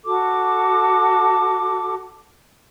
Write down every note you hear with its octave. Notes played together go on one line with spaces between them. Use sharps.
F#4 A4 D6